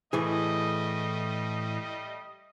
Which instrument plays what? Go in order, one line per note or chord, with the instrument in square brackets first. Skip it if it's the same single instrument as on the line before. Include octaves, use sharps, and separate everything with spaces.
[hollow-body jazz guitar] A2 E3 G#4 [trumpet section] G3 A3 D#5